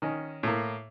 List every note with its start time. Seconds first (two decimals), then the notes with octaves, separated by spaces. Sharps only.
0.02 D#3 C#4 D#5
0.43 A2 A#3